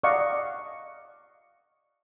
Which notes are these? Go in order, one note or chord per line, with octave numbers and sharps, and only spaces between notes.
D5 D#5 F5 F#5 A#5 C#6